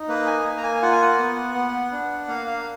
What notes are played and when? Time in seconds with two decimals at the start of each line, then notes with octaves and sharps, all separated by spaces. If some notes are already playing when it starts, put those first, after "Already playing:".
Already playing: D#4
0.08 A#3 B4
0.26 G#5
0.45 A#3
0.57 A#5
0.63 G#5
0.82 F4 F#5
0.92 G#5
1.02 F#5
1.19 B3
1.55 B3
1.92 D4
2.28 A#3 F5
2.47 F5